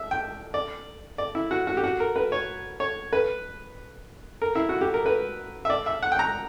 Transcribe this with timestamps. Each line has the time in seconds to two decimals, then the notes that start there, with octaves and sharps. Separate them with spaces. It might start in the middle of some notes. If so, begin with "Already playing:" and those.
Already playing: E5
0.11 G5
0.54 D5
1.18 D5
1.35 E4
1.51 F#4
1.67 F#4
1.77 G4
1.84 F#4
2.00 A#4
2.16 B4
2.32 C#5
2.80 C#5
3.13 B4
4.42 A#4
4.55 E4
4.69 F#4
4.81 G4
4.94 A#4
5.06 B4
5.65 E5
5.70 D5
5.86 E5
6.03 F#5
6.12 G5
6.19 A#5